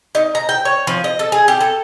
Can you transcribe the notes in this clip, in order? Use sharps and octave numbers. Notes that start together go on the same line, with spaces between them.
D#4
A#5
G5
C#5
F3
D#5
A4
G#4
G4
A4